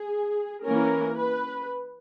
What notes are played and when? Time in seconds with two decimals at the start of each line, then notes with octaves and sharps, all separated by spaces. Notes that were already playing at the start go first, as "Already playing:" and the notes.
Already playing: G#4
0.65 E3 A#3 C#4 A#4
1.18 B4